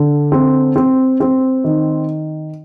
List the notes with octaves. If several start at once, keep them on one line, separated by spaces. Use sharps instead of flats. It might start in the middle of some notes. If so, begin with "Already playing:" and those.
Already playing: D3
C4
C4
C4
D#3